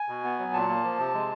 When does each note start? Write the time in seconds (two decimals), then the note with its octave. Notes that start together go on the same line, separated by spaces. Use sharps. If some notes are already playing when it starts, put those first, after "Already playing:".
Already playing: G#5
0.08 B2
0.24 B3
0.39 F#3
0.53 A#2 A5
0.69 A#3
0.84 F3
0.99 C3
1.14 G#3